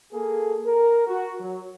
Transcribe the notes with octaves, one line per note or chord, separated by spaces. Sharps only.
A#3 G#4 A4
A#4
F#4
F#3